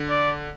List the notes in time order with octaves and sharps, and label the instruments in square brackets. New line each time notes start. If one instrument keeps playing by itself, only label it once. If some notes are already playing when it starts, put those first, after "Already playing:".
Already playing: [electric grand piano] D3
[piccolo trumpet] D5